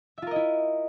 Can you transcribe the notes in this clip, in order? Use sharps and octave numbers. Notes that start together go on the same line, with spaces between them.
E4 F4 A#4 D#5 E5